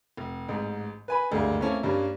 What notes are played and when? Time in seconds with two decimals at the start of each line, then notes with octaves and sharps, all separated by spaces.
0.17 F1
0.48 A1 G#2
1.08 B4 G#5 B5
1.31 F#1 D2 G2 G#3 A#3
1.60 A3 A#3 C4 C#4 E4 A4
1.83 G2 G3 A#3 C#4